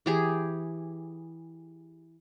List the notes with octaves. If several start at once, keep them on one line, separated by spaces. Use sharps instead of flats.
E3 G4 G#4